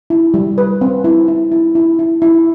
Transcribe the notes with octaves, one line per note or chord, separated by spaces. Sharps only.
E4
G3
B4
C4
E4
E4
E4
E4
E4
E4